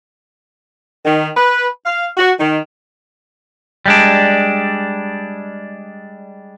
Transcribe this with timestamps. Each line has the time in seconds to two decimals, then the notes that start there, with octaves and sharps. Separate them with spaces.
1.05 D#3
1.36 B4
1.86 F5
2.17 F#4
2.39 D#3
3.86 G3 G#3 D4